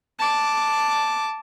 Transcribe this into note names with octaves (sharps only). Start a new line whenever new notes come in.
A5 D6